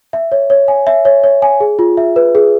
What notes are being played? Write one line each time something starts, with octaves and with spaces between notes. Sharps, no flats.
E5
C#5
C#5
G#5
E5
C#5
C#5
G#5
G#4
F4
E5
B4
G#4